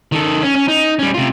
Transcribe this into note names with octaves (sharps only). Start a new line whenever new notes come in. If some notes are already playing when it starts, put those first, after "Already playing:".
D#3 A4
C#4
C#4
D#4
G3 C#4
C3 F4